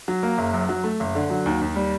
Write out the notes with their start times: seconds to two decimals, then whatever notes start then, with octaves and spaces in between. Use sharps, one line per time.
0.08 F#3
0.23 A#3
0.38 F#1
0.53 F#2
0.69 F#3
0.84 A3
1.00 F#1
1.15 D3
1.30 F#3
1.46 D#2
1.61 D#2
1.76 G3